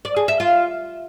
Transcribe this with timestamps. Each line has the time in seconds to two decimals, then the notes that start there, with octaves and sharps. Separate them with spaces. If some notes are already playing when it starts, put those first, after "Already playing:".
0.05 D5
0.16 G#4
0.28 E5
0.40 F4